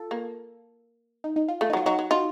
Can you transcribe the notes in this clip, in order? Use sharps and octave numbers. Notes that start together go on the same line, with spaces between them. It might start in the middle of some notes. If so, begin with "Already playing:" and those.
Already playing: F4 A4
A#3
D#4
D#4
F4
A3 F4
D#4
F#3 F4
F#3 D#4 F#4
F#3
D#4 F4 F#4